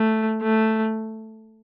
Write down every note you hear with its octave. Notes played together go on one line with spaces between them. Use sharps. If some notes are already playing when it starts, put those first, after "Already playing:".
Already playing: A3
A3